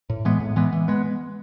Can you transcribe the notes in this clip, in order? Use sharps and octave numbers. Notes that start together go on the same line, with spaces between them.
A2
E3 G#3 B3
A2
E3 G#3 B3
E3
G#3 B3